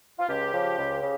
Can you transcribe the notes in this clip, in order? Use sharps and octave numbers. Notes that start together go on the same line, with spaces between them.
F4
C#2 G4
C#3 F3
C#2
C#3